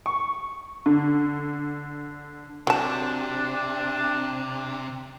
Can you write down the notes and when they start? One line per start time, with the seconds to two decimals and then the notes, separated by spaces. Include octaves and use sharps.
0.06 C#6
0.86 D3
2.67 C3 F#3 D4 A5